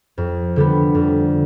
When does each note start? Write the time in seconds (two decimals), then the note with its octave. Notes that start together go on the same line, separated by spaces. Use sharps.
0.18 F2
0.56 D3 G3 B3
0.95 F2